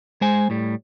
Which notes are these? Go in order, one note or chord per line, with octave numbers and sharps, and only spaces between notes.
G#3 C5 G#5
A2 G3